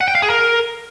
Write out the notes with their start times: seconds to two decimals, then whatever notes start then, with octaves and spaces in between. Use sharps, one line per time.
0.01 F#5
0.08 G5
0.15 F5
0.22 G#4
0.30 A#4